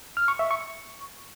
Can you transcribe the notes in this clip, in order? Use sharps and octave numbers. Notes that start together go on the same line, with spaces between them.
F6
C#6
E5
C#6